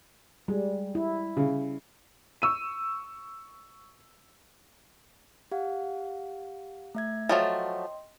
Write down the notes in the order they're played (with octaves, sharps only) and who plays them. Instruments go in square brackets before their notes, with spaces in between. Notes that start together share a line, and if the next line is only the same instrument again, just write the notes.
[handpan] G3 [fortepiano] G#3
[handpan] E4
[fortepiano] C#3
[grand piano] C#6 E6 D#7
[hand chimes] G4 F5 F#5
A3 E5 G#6
[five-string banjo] F3 F#3 A3 [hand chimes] D#5 G5 C6